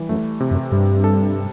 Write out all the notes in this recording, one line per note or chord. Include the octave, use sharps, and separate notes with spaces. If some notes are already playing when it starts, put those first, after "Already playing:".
Already playing: E3 G3
F#2 A3
C3
F#2
G2 G3
A4